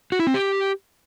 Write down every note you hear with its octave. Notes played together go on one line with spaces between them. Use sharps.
F#4
E4
C4
G4